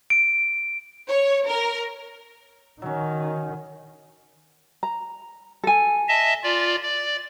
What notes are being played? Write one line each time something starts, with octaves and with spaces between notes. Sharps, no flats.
D7
C#5
A#4
D#3 F#3 C#4
A#5
A4 G#5
D#5 E5 A5
F4 D5
D5